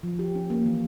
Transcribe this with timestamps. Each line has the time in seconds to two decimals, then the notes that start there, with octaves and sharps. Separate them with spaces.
0.03 F3
0.19 G4
0.35 C#4
0.50 A#3
0.66 E3